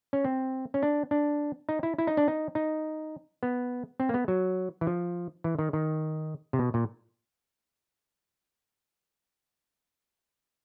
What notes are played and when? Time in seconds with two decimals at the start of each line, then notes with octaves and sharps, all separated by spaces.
0.13 C#4
0.25 C4
0.74 C#4
0.83 D4
1.11 D4
1.69 D#4
1.83 E4
1.98 E4
2.07 D#4
2.17 D4
2.28 D#4
2.55 D#4
3.43 B3
4.00 C4
4.09 A#3
4.14 B3
4.28 F#3
4.81 E3
4.87 F3
5.44 E3
5.59 D#3
5.73 D#3
6.53 C3
6.59 B2
6.74 A#2